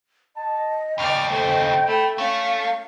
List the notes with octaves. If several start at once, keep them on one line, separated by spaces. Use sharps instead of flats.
D#5 A5
D#2 C#3 D5 G5 F6
A3 C5 D#5
A3 B5
A3 C#4 F5 C#6